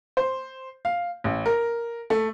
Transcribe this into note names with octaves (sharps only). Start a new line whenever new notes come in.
C5
F5
A1
A#4
A3